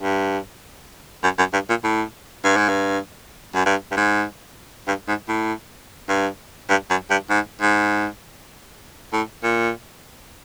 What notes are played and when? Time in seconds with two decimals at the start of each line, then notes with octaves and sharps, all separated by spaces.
0.02 G2
1.24 F#2
1.38 F#2
1.53 G2
1.69 A#2
1.84 A2
2.44 G2
2.57 G#2
2.69 G2
3.54 F#2
3.66 G2
3.91 G2
3.97 G#2
4.87 G2
5.08 G#2
5.28 A2
6.09 G2
6.69 G2
6.90 F#2
7.10 G2
7.30 G#2
7.61 G#2
9.12 A2
9.43 A#2